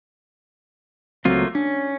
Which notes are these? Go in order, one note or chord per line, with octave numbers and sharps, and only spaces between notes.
C#2 F#3 A3 A#3 C4 F4
C#4 D4